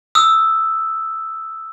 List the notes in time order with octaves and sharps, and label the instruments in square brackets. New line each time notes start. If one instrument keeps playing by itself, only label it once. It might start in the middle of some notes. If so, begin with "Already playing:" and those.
[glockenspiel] D#6 E6